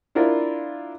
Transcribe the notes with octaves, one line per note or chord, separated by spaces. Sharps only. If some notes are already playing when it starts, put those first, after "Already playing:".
D4 E4 F4 A#4